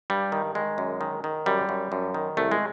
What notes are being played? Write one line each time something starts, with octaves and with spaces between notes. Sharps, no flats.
G2 G3
D#3
D#3 G#3
F#2
D#3
D#3
F#2 G3
F#2
F#2
D#3
C2 A3
G#3